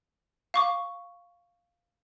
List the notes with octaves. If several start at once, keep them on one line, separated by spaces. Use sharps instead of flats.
F5 C#6 D6